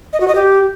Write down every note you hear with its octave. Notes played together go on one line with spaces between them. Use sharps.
D#5
F#4
D#5
G4